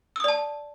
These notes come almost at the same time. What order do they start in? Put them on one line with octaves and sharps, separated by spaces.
E6 D#6 D5 A5